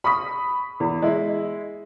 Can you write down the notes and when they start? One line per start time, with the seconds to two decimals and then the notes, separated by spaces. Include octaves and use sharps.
0.04 B5 C#6 D#6 B6
0.80 E2
1.02 G#3 E4